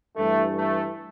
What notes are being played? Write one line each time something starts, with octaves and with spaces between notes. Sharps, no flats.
G2 E3 A3
A3